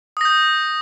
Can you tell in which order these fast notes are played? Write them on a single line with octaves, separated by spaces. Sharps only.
D#6 A#6 G6